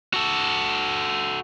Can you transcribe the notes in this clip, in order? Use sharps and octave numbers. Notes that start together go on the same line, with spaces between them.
F#4 A4